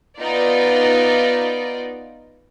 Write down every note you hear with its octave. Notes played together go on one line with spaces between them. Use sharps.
B3 D#4 F4 D5